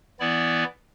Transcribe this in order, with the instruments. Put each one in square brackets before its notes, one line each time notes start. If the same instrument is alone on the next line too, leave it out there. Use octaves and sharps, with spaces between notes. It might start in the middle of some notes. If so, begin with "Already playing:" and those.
[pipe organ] E3 B3 E4 D5